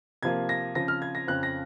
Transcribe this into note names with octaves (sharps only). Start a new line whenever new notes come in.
C3 F3 A#3 G#6
A#6
C#3 F3 C4 A#6
F6
G#6
A#6
F2 C#3 F3 F#6
A#6